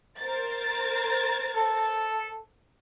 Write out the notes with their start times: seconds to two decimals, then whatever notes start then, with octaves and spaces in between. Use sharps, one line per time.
0.19 A#4 C5 A6
1.55 A4